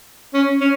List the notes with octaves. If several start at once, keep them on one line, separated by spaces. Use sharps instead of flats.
C#4
C#4